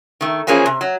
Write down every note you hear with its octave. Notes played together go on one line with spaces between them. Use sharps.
D#3 A3
E3 F3 A#3 C#4 G#4
C3
F#3